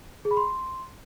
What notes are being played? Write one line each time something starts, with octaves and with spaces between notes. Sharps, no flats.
G#4
B5
C6